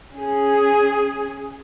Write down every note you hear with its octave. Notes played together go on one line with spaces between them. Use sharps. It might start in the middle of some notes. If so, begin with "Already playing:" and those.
C#4 G#4